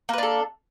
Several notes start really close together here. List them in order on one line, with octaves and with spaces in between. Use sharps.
A#3 B4 D4 A4